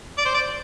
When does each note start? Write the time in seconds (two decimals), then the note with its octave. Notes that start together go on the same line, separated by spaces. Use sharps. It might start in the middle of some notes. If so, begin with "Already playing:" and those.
0.18 D5
0.26 C5
0.34 D5